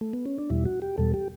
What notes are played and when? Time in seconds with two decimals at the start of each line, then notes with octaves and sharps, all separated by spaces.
0.01 A3
0.13 B3
0.26 C#4
0.39 D4
0.50 E2 B2 G3 E4
0.65 F#4
0.82 G4
0.98 E2 B2 G3 A4
1.14 G4